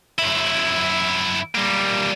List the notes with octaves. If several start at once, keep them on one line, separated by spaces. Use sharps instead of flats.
F#2 E4
G3 A#3